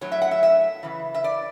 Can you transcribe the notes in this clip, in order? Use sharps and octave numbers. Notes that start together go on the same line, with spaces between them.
A2 F#3 C#5
E5
F#5
E5
E5
C#3 E3
E5
D5